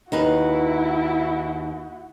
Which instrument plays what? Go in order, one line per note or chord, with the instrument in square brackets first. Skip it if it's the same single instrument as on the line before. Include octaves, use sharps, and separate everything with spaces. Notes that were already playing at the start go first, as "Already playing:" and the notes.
[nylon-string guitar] D#2 D#4 B4 [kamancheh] E4 F#4